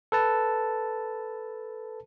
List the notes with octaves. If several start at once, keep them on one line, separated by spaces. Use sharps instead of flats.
A4 B4 A5